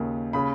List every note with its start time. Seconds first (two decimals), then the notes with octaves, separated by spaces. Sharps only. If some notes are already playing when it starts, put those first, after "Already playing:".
Already playing: D#2 C#3
0.33 C#3 B5